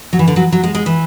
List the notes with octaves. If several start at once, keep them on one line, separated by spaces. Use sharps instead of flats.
F#3
E3
D3
F#3
F#3
G#3
G#3
E3